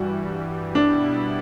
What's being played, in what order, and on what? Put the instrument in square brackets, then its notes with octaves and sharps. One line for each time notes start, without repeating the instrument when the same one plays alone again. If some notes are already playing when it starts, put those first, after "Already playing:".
Already playing: [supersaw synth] G2 E3 G3 [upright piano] F#4
[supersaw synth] B2 G3 B3 E4 [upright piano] D4